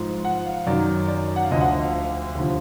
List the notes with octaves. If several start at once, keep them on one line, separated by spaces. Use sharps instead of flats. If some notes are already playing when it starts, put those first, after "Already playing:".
Already playing: G#2 F3
F#5
F5
F#2 D#3 F#3 D5
D5
F#5
F5
D2 D3 F3 D#5
F#5
F5
D#2 D3 F3